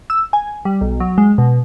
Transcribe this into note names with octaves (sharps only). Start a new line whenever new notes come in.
E6
G#5
G3
B1
F#3
G#3
B2